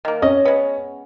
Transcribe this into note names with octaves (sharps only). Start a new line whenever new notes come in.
D#3 A#3
C#4 D#5
G#3 B3